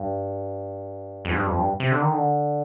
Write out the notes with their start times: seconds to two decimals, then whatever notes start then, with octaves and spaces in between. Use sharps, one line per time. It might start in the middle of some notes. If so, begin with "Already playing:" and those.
Already playing: G2
1.25 F2
1.31 G#2
1.36 G2
1.47 F2
1.58 G2
1.80 C3
1.92 D3
2.02 D#3
2.13 D3